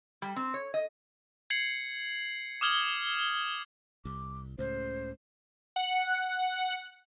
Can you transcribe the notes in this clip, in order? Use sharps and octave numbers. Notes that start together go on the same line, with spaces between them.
G3
C4
C#5
D#5
G#6 C7 C#7 F#7
D6 D#6 F6 G#6 F#7 G7
C2 D6
C#2 A2 C#3 C5
F#5